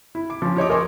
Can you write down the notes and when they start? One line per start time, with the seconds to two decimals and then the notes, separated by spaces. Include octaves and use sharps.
0.15 E4
0.30 D6
0.42 F3 C#4
0.57 G4 C#5 D#5 D6
0.70 A#4 D#5 G#5 C6 C#6